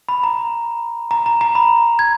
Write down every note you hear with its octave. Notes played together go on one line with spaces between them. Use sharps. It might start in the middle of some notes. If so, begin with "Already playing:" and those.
B5
A#5
A#5
A#5
A#5
B5
G#6